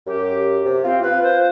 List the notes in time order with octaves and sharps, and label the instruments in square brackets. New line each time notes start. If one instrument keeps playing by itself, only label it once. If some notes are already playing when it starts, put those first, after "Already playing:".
[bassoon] F#2 [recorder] G4
[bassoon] C3
[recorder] C4 [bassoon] F4
[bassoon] F4 [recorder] B4
[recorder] C5